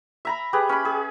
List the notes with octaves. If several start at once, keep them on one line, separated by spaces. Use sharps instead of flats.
E5 A#5 B5
G4 G#4 B4
C#4 B5
G#4